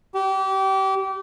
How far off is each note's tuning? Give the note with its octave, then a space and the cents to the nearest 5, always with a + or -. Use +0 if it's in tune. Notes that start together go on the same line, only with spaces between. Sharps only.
G4 -30